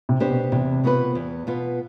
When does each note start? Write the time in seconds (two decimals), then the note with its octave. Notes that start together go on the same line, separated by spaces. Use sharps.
0.09 C3
0.20 B3 D4 G4 C5
0.31 B2
0.52 E2 C3
0.84 B2 B3 F4 B4
1.15 E2
1.47 B2 B3 F4 B4